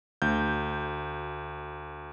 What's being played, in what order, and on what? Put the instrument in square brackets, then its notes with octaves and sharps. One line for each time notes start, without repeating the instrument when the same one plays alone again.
[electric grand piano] D2 G6